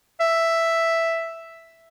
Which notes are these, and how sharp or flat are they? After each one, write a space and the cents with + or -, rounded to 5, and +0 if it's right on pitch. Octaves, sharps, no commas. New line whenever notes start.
E5 +5